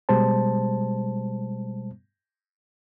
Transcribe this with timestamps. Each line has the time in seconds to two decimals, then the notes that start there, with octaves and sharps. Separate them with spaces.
0.09 B2 G3 G#3 C5 A5